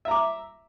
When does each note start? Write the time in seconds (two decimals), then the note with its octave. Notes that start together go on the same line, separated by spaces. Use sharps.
0.05 E5
0.08 A#5
0.11 D6